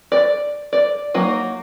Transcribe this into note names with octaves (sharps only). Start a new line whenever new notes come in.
D5
D5
F#3 A#3 D#4 F#4